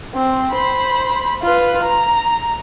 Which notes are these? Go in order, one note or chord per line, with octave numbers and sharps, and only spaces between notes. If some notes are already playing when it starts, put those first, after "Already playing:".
C4
C5 B5
F4 B4
A#5